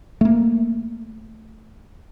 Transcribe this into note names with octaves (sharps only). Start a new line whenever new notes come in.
A3 A#3